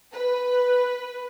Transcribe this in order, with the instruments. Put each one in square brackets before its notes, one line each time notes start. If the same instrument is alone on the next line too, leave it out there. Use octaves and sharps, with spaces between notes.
[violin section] B4